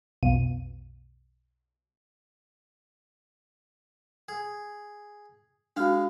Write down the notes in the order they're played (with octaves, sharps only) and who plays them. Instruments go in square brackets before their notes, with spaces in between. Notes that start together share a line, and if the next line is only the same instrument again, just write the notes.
[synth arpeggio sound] B1 F2 B2 D#7
[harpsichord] G#4
[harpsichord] G#3 F5 [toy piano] D4 F#4